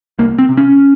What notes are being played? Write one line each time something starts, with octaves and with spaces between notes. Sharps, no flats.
C2 A#3
C4
C3
C#4